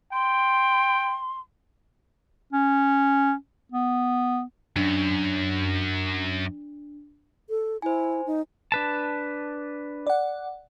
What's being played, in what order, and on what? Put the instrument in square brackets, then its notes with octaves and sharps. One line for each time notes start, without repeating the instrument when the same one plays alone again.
[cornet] G5 [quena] C6
[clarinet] C#4
B3
[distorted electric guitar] F#2 [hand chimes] D4
[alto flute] A4
[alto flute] E4 [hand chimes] C5 G#5
[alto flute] D#4
[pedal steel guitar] D4 B4 A5
[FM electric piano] D5 F#5